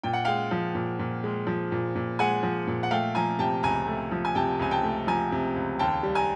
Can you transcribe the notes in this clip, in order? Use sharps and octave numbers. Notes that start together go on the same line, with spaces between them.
A#2 G5
F#5
G#3 F5 G5
F3
A#2
A#2
G#3
F3
A#2
A#2
G#3 F#5 G#5
F3
A#2
F#5
A3 F5 G5
F3 G#5 A#5
C3 G5 A5
C#2 G#5 A#5
A3
F3
G#5
C3 G5 A5
C#2 G#5
G5 A5
A3
F3 G#5 A#5
C3
C#2
D#2 G5 A5
G3
G#5 A#5